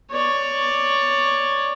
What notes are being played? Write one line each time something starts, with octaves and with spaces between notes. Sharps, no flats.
C#5 D5